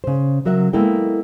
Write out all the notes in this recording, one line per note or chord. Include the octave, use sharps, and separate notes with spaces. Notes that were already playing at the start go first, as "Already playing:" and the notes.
C#3 C5
C#3 F#3 A#4 E5 F#5
G#3 A#3 B3 E4 A4 G5